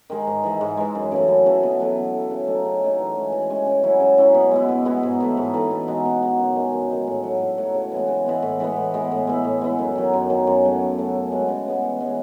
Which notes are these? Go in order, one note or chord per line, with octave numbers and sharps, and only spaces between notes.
D#3 G#3
G#2
E3 G#3
G#2
E3 G#3
F#2
C#3 E3 A3
F#2
C#3 E3 A3
B2
F#3 A3
B2
F#3 A3
C#3
F#3 A3 D#4
C#3
F#3 A3 D#4
E3
G#3 C#4
E3
G#3 C#4
C#3
F#3 C#4 E4
C#3
F#3 C#4 E4
B2
G#3 B3 E4
B2
G#3 B3 E4
G#2
E3 A3
G#2
E3 A3
B2
G#3 D#4 F#4
B2
G#3 D#4 F#4
F#2
D#3 G#3
F#2
D#3 G#3
A2
F#3 A3
A2
F#3 A3
C#3
E3 G#3 B3
C#3
E3 G#3 B3
A2
E3 G#3 B3
A2
E3 G#3 B3
A2
G#3 B3 E4
A2
G#3 B3 E4
F#2
D#3 F#3
F#2
D#3 F#3
F#2
C#3 F#3 A3
F#2
C#3 F#3 A3
C#3
G#3 B3 F#4
C#3
G#3 B3 F#4
E3
G#3 C#4